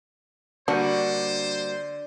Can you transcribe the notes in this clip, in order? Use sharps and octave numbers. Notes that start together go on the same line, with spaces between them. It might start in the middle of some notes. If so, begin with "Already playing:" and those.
D3 G3 A#3 D4 F#4 C5